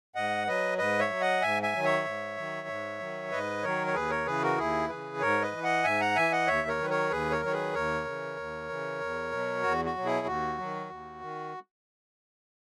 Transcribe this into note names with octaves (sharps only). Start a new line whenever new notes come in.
G#2 D#5 F#5
F#3 B4 D#5
G#2 B4 D#5
C#5 E5
F#3
D#5 F#5
G#2 E5 G#5
E5 G#5
D#3 F#3
C#5 E5
G#2
D#3 F#3
G#2
D#3 F#3
G#2 B4 D#5
D#3 F#3 A#4 C#5
C#5
D#2 G#4 B4
A#4 C#5
C#3 E3 G#4 B4
F#4 A#4
D#2 E4 G#4
C#3 E3 G#4 B4
G#2 A#4 C#5
B4 D#5
E3
D#5 F#5
G#2 E5 G#5
F#5 A#5
E3 E5 G#5
D#5 F#5
D#2 C#5 E5
A#4 C#5
D#3 F#3 B4
A#4 C#5
D#2 G#4 B4
A#4 C#5
D#3 F#3 C#5
G#4 B4
D#2 A#4 C#5
C#3 E3
D#2
C#3 E3
E2
B2 F#3
E2 F#4
F#4
B2 F#3
E4 G#4
D#2 F#4
D#3 F#3
D#2
D#3